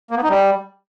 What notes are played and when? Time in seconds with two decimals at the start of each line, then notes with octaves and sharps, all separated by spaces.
0.11 A#3
0.17 B3
0.23 D#4
0.30 G3